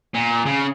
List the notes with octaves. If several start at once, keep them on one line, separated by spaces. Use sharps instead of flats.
A#2
C#3